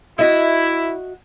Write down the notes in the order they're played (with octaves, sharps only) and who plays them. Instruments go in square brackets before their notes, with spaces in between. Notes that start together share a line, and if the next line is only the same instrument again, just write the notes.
[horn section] E4 [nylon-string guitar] F#4 D#5 E5